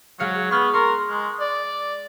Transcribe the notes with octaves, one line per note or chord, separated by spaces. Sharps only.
F#3 G#3 F5 C#7
B3 C#6 F6
A#4 C6 C#6
G#3
D5